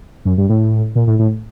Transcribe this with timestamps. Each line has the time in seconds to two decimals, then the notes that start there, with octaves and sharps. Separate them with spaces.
0.25 F#2
0.38 G2
0.49 A2
0.95 A#2
1.07 A2
1.19 A2